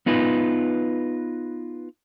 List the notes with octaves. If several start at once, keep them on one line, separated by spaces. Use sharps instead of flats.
B3 D#4 F4 B4